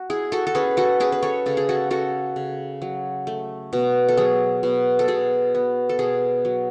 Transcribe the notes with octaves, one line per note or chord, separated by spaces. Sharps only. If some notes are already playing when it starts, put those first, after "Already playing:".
Already playing: F#4
E4 G#4
F#4 A4
A4
C#4 G#4 B4
F#4 A4
C#4 G#4 B4
B4
A4 C#5
C#3 A4
G#4
F#4 A4
C#4 F#4 A4
C#3
F#3
A3
B2
A4
F#3 G#4
B2
A4
B2 G#4
B3
A4
B2 G#4
F#3